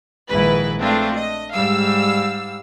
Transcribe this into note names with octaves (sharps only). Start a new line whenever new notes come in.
A#1 G#2 D#3 E4 B4
A3 C4 D4 F4
D#5
G#2 G3 F5 E6